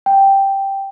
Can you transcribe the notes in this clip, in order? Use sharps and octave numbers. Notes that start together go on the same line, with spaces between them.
G5